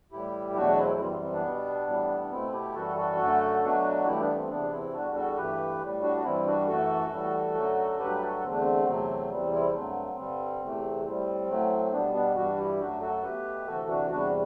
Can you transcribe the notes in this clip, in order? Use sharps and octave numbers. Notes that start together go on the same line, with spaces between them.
A2 E3 G3 E4 G4
E2 B2 F#3 A3 D4 F#4
C4 E4
F#2 E3 G3 C4
C4
C4
B3 D4
B2 G3
A2 E3 G3
D4
B2 A3 C4 E4
E4 G4
F#2 E3 G3 F#4 A4
F#4 A4
F#2 D3 A3
B2 F#3 A3 D4 F#4
G2 E3 A3 E4 G4
B3 D4
C4
E2 C3 E3 B3 D4
C4 E4
E2 D3 G3 D4 F#4
F#4 A4
G2 E3 A3 G4 B4
A2 G3
D4 F#4
F#4
G2 E3 G3 C4 E4
D4 F#4
F#2 E3 A3 F#4 A4
A2 E3 G3
F#2 D3 F#3 A3
G2 F#3 A3 G4 B4
F#4 A4
E2 D3 A3 C4
D4
C4
E2 C3 F#3 A3
E2 C3 E3 G3 C4
C4 E4
G2 D3 F#3 A3 C4
G2 D3 G3
E2 C3 E3 A3
A2 G3 C4
A2 F#3 A3
B2 G3 B3 D4
B3 D4
G2 E3 G3 D4 F#4
E4 G4
F#2 F#3 A3 D4 F#4
F#4 A4
B2 A3 G4 B4
D2 C3 E3 A3 F#4 A4
D4 F#4
E2 C3 G3 D4 F#4